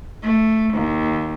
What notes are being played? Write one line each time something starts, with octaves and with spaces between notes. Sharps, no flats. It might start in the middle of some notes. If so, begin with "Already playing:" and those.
A3
D#2